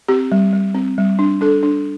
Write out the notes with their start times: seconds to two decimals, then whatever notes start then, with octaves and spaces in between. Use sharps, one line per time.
0.08 C4 G4
0.32 G3
0.53 G3
0.75 C4
0.98 G3
1.19 D4
1.41 D4 A4
1.63 D4